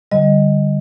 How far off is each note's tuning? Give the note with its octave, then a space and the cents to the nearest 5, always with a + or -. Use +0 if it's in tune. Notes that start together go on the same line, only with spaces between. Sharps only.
D3 +0 G3 +0 D#5 +0